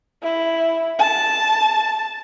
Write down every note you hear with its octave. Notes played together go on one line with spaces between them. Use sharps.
E4
A5